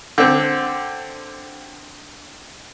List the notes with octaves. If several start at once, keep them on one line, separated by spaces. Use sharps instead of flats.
D3 C4